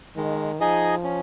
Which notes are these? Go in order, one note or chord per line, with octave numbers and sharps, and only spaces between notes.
D#3 G#3
F3 D#4 G#4 D#5 G#5
C#4